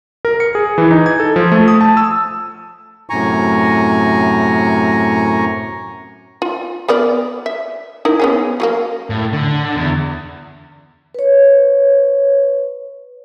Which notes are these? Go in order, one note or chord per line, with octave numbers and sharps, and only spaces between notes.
A#4
C#7
G#4
E3
D#4
G#6
A4
F3
A3
D#6
A5
E6
F#2 A2 C3 G#5 A#5 C#6
F4
B3 A#4 D5
E5
D#4 E4 A#4
B3 C#4 G#4
F#3 A3 A#3
A2
D3
E2
B4 C#5